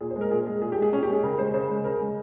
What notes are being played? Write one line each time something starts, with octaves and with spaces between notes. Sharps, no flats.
A#2 G#4
C5
G#3
A#4
A#2 G#4
G#3 G#4
A#2 G#4
G4
G#3 G#4
A#2 C#4
G4
G#3
G#4
C#3 A#4
G#3 C5
C#3 C5
G#3
C#3 A#4
G#3